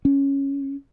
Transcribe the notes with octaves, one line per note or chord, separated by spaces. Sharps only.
C#4